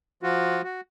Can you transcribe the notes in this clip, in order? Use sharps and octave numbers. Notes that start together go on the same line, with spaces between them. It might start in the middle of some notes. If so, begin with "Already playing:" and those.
F3 F4 F#4
F#4